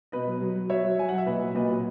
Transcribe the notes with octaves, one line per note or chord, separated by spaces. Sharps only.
B2 B4 D#5
F#3
F#3
F#3
F#3 C#5 E5
F#3
F#3 G#5
F#3 F#5
E5
A#2 B4 D#5
F#3
A#2 B4 D#5
F#3